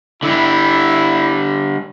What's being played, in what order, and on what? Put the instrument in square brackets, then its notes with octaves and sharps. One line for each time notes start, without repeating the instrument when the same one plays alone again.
[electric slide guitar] D3 G3 [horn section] E4